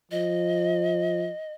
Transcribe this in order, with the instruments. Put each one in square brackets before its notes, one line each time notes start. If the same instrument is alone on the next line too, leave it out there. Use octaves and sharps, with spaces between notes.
[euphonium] F3 [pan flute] D#5